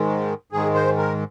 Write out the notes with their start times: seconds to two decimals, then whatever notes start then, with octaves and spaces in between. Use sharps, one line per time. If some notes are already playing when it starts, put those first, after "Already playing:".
Already playing: G#2 D#3 G#3
0.52 G#2 D#3 G#3 G#4
0.75 C5
0.97 A#4